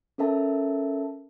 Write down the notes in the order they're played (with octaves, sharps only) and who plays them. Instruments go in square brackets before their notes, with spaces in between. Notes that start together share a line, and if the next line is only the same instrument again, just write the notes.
[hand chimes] C#4 A4 A#4 E5 A5